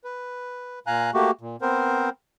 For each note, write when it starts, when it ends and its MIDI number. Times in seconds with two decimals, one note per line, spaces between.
0.04 0.79 71
0.87 1.11 46
0.87 1.11 77
0.87 1.11 80
0.87 1.11 82
0.87 1.11 90
1.14 1.31 57
1.14 1.31 58
1.14 1.31 66
1.14 1.31 67
1.41 1.56 46
1.61 2.09 59
1.61 2.09 60
1.61 2.09 70
1.61 2.09 72